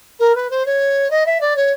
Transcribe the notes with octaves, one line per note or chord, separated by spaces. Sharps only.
A#4
B4
C5
C#5
D#5
E5
D5
C#5